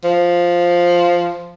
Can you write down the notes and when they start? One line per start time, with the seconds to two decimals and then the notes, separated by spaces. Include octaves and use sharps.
0.04 F3